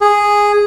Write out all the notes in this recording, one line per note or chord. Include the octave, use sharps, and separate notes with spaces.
G#4